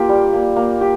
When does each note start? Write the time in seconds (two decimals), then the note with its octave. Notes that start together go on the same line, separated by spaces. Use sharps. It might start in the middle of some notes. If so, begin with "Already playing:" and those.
Already playing: A#3 F4 G4
0.09 G3
0.33 A#3
0.56 A#3
0.81 G4